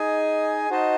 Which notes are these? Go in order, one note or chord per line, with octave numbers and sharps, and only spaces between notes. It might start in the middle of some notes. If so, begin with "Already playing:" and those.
Already playing: D#4 G#4 D#5 G#5
D#4 F#4 C5 D#5 A5